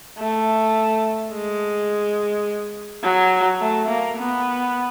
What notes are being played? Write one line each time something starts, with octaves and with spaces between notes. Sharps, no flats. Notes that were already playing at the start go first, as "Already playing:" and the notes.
A3
G#3
F#3
A3
A#3
B3